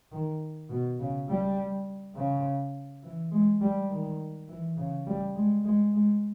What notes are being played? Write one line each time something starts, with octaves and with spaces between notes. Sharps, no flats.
D#3
B2
C#3
G3
C#3
E3
G#3
G3
D#3
E3
C#3
G3
G#3
G#3
G#3